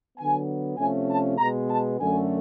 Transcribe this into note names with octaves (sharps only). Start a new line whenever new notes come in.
D3 F#3 B3 G#5
C3 F3 A3 C#4 G#5
A5
B2 G#3 B3 A#5
A5
F#2 D3 F#3 A3 C#4 G#5